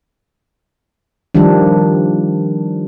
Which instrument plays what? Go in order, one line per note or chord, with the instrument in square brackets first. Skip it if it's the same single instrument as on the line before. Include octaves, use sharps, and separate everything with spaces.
[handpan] D#3 F3 G3 D4